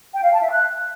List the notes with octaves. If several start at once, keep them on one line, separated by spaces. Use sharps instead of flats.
G5
F5
A5
E5
F#6